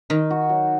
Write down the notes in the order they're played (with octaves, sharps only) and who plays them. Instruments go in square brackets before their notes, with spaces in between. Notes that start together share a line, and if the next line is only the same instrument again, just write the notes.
[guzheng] D#3 [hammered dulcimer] D#4
[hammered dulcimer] F#4
F#3